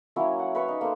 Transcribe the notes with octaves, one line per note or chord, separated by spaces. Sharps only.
F#3 A#3 C#4 E4
F#5
B4 F5 B5 C#6
D#4
A#3 A4 C5